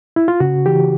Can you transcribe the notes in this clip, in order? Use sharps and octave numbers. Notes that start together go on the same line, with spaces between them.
E4
F4
C#3 F#4
E3 G4